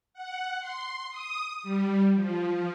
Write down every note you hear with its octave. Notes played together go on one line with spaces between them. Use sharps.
F#5
C6
D#6
G3
F3